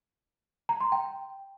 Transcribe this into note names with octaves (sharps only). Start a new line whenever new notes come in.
A#5
C6
G5